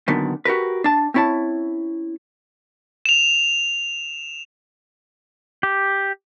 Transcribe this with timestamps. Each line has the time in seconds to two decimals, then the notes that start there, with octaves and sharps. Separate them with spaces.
0.08 F#2 A#2 D3 D#3 B3
0.45 F#4 G4 A#4 B4
0.84 D4 A5
1.14 C4 C#4 E4 C#5 A5
3.06 E7 F7
5.63 G4